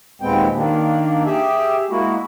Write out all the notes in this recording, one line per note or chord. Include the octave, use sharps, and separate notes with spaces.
D#2 A#2 G#3 B3 C4 G5
D#3 A#3 D4
G4 G#4 E5
G#3 A#3 E4 F#4